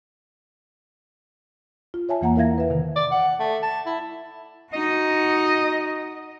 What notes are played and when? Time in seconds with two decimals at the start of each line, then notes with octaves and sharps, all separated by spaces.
1.94 F4
2.09 C#5 E5 G#5 A5
2.21 E2 E3 A#3 F#5 G#5 A#5
2.36 E4 A#4 E5 F5 G#6 A#6
2.58 B4 E5
2.70 C3 D#3
2.96 D5
3.12 F#5
3.40 A3
3.63 A5
3.86 E4
4.73 D#4 F#4 D#5